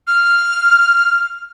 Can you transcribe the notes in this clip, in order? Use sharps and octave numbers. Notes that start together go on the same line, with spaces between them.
F6